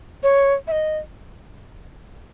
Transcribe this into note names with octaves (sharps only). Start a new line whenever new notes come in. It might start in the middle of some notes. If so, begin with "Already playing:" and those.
C#5
E5
D#5